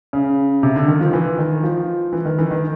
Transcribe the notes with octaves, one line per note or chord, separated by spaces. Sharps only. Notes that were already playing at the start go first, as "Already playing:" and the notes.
C#3
C3
D3
D#3
F3
E3
D#3
F3
E3
D#3
E3
D#3